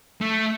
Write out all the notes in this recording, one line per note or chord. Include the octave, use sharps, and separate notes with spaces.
A3